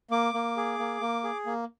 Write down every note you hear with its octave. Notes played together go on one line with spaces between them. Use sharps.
A#3 D6
A#3
G#4
A#3
A#3
G#4
A#3